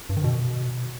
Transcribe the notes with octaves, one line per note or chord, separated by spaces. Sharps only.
G2
D#3
B2